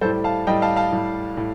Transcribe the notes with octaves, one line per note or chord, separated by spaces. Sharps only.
A2 G3 A4 C5
F5 A5
A2 G3 D#5 G5
F5 A5
F5 A5
A2 G3
A2